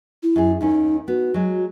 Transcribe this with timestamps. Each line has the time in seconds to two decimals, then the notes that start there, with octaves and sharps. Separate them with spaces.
0.23 E4
0.36 F#2 G#4
0.61 D#2 D#3 C#4 D#4
1.08 B3 F#4
1.34 F#3 G#3